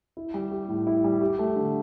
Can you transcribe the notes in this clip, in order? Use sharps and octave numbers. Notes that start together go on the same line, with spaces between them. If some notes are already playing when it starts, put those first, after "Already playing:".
E4
G3
G4
A2
E4
G3
G4
A3
D3